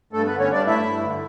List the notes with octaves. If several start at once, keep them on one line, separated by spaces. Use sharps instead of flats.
G2 A3 A4
D3 B3 B4
C#4 C#5
G2 D4 D5
A3 E4 E5
G2
D3